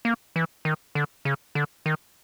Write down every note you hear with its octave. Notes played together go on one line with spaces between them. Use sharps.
A#3
E3
D#3
D3
C#3
D3
D#3